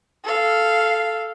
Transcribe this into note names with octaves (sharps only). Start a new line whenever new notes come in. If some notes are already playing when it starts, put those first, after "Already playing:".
A4 F5